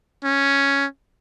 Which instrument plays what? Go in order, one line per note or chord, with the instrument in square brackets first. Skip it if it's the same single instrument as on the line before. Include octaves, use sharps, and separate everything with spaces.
[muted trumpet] C#4